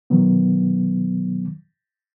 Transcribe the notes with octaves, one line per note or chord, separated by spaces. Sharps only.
B2 D#3 F#3 B3